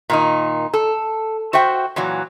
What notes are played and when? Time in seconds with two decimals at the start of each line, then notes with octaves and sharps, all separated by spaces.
0.10 A#2 D#3 D#4
0.74 A4
1.53 F#4 C5 E5 G5
1.96 A#2 E3 F#3